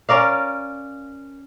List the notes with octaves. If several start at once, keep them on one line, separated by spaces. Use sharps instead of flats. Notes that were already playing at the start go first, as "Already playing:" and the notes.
C#4 A#4 D5 F5